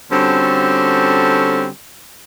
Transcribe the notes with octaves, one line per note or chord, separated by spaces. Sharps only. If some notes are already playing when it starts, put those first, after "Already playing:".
D3 G3 C4 C#4 F#4 A4